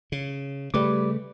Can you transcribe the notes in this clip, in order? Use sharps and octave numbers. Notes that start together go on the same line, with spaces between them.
C#3
C#3 G3 A3 B4 D6